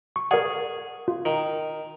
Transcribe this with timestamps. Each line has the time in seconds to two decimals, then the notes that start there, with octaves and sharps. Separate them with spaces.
0.16 C#6
0.31 G#4 A#4 D5 F#5
1.08 F4
1.25 D#3